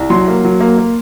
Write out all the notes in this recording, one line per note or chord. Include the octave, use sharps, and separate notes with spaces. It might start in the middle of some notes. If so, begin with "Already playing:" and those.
Already playing: C2
F#3 C6
A#3
F#3
A#3
A#3